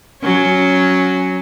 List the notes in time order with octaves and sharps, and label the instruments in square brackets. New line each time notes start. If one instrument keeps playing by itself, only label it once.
[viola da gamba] F#3 C#4